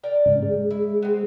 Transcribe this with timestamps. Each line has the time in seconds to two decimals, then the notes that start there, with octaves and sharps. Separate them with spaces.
0.03 A#4 D5 G5
0.26 G#2 C#3
0.43 G#3
0.71 E4
1.02 B3 C4